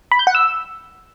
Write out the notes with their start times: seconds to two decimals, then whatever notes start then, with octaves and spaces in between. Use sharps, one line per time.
0.12 B5
0.19 G6
0.27 F#5
0.35 E6